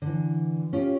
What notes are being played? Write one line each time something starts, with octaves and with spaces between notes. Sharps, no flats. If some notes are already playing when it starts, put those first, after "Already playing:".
D3 E3
C#4 F4 G4